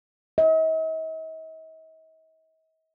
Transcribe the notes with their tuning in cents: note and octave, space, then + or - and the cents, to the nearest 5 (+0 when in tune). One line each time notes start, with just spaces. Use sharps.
D#5 +45